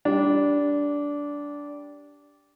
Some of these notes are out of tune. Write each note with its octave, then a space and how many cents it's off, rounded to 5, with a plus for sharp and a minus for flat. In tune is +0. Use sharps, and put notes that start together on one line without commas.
G3 +0 D4 -15